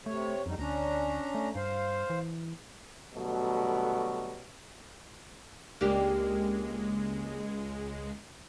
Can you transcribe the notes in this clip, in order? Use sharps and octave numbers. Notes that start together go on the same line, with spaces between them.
C3 A3 C#5
F2 D3 G3 D#4
D2 C#4 D4 A#5
A3
G2 C5 F5
E3
B2 D3 F#3 G3 A3
C#2 G#3 A#3 D4 G4